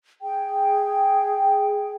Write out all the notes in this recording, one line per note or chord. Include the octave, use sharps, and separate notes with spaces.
G#4 G5